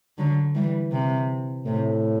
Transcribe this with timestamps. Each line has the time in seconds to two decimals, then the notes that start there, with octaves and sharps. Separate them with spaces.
0.18 D3 F#3
0.55 E3 G3
0.92 C3
1.65 A2 C3